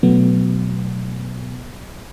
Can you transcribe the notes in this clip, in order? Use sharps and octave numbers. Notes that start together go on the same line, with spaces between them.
B2 F#3 A3 B3